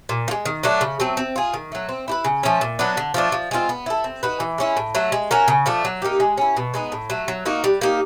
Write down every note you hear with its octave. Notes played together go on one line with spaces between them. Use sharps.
A#2
F3
G#3
D#3
F#3 A3 D4
C#3
F#3 A3 C4
C4
F4 G#4
D#3
F#3 A3
C4
E4 G4 B4
C#3
F3 A3 C#4
A#2
F#3 B3 D4
D3
F3 A3 D4
F3
G#3 C4 F4
B3
E4 A4
C4
D#4 F#4 B4
E3
G#3 C#4 E4
A2
F#3 A3
G#3
C#4 F#4 A#4
C#3
F3 A3 D4
F#3
A#3 D#4 G4
G#3
C#4 E4
B2
G#3 B3 D#4
A2
F#3 A3
F#3
A#3 D#4 F#4
G3
A#3 D#4 G4